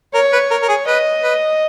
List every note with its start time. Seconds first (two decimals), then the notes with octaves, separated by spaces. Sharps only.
0.14 A#4 C#5
0.33 B4
0.51 A#4
0.63 A#4
0.69 G#4
0.87 B4 D#5
1.23 B4